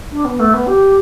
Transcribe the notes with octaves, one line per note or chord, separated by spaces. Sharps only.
D4
B3
A3
B3
G4